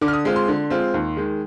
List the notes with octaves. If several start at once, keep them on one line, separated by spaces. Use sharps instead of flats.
D3 D6
F6
D#6
G#3 C4 F4
C6
D3
G#3 C4 F4
D#2
D#3 G#3